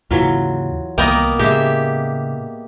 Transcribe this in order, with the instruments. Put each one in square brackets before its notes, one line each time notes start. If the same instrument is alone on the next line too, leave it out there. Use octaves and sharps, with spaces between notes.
[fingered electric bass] D#2 G#2 C#3 [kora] E3 F#3 F4
[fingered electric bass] C2 D#3 [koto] A#3 B3 [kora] A#4 D#5 G5
[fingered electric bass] A2 C#3 [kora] G#3 [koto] G4 E5